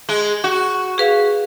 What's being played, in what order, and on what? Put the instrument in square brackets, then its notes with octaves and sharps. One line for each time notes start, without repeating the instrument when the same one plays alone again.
[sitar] G#3
F#4
[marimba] G#4 B4 F5